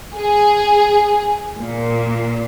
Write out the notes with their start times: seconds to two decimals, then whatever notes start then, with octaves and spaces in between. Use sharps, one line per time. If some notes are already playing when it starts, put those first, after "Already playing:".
0.16 G#4
1.57 A#2